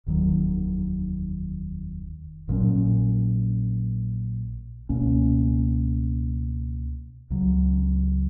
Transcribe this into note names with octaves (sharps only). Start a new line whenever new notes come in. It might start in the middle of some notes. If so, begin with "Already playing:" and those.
F1 D#2 D#3 F#3
A#1 A#2 F#3 C#4
C#2 B2 A#3 C#4
C#2 C#3 F#3